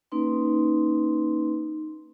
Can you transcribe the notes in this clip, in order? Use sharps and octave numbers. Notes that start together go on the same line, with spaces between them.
A#3 C#4 D#4 B4 C6